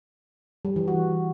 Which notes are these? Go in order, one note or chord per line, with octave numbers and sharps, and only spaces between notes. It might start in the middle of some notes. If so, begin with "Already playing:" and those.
G3
E3
F#4